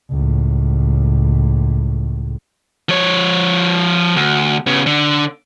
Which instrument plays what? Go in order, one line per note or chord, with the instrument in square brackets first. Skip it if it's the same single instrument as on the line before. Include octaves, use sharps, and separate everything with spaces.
[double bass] C#2 A2
[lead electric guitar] F3 C#5
D2
C#3 B3
D3